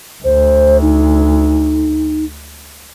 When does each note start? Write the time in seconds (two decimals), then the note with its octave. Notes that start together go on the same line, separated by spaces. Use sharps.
0.24 D2 C5
0.82 D#4